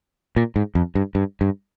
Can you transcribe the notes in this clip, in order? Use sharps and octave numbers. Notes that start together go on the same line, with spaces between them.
A#2
G#2
F2
G2
G2
G2